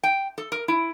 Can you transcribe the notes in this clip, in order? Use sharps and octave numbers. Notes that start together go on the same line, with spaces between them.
G5
A4
A#4
E4